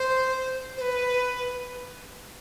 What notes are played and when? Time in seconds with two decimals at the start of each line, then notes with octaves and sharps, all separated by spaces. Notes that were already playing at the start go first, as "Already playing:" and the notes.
Already playing: C5
0.77 C5
0.81 B4